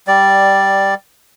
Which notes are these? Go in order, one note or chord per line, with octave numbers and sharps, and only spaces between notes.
G3 D5